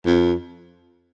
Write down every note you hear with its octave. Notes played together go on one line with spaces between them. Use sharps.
F2